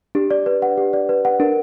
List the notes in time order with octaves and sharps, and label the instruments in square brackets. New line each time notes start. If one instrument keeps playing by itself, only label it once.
[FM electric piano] D4 [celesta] G4
[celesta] D5
B4
F#5
G4
D5
B4
F#5
[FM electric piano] D4 [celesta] A#4